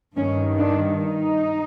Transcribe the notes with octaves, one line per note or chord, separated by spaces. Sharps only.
G2 D#3 C#4
D4
D#4